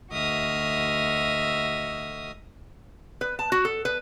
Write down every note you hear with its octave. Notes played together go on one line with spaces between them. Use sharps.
D2 F#4 D#5 E5 D#6 F6
B4
A5
F#4
A4
B4